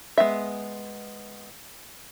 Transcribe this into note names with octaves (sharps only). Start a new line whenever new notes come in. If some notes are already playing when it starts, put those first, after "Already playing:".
G#3 B3 E5